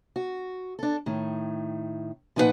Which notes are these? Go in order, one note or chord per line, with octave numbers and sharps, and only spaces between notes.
F#4
D4 A4
A2 D#3
A#2 F3 D#4 E4 B4 F#5